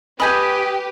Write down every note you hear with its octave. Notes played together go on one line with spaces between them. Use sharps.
G4 B4 D#5 G#5 B5 G6